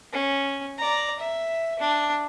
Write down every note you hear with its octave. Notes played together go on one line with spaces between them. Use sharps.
C#4
D5 A#5
E5
D4